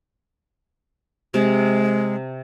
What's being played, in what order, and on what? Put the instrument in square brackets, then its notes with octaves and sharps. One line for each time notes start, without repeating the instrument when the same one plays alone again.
[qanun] C3 [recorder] G#3